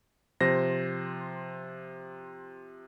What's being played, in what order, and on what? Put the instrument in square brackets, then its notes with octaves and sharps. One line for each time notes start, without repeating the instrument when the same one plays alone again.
[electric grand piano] C3 F3 C5 A#6